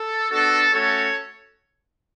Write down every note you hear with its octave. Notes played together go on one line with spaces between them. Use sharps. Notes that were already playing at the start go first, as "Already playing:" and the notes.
Already playing: A4
B3 D4 F#4 A4
A3 C#4 F#4 A4 C#5